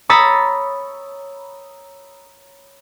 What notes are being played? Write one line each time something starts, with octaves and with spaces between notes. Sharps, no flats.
C#5 A#5 B5 D#6 E6 A6